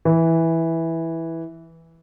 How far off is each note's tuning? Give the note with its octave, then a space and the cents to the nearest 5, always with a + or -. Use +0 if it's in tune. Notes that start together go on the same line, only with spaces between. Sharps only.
E3 -5